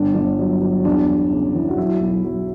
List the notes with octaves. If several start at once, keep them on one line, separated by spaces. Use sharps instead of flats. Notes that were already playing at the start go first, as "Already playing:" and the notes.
Already playing: G1 D4
G1 D4
F#3
F#3
E2 D4
E3
C#3
E3
F#4
F#3 E4
B1
F#3